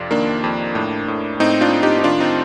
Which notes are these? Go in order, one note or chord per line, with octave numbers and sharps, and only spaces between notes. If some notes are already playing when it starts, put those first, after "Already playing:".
Already playing: F2 C3 D4 F4
D#3 A#3 D4
F2
A2
A2
A2 C4 D#4
D4 F4
A2
D#4 G4
D#4
D#3 D4 F4
C4 D#4